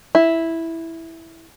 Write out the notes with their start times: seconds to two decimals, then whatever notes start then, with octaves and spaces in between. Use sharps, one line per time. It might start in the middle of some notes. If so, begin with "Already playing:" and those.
0.15 E4